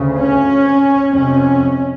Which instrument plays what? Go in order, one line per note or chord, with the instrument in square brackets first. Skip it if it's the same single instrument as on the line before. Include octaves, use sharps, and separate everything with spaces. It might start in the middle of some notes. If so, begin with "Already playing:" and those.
Already playing: [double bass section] D2 C#3
C#4
F2 C3 C#4